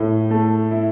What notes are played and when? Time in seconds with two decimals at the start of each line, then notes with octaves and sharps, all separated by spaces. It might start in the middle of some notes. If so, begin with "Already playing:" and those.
Already playing: A2
0.31 A3
0.71 E4